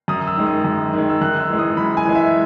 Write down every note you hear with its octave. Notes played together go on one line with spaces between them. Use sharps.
F#2 D#6
E6
D#3 G#3
D#6
F#2
D#3 G#3
E6
F#2 F#6
E6
E3 G#3
D#6
F#2 B5
G#5
E3 G#3
E5